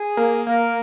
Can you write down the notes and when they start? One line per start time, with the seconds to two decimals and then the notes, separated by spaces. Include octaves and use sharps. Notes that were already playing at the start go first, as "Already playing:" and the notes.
Already playing: G#4
0.17 A#3
0.47 A#3 A#4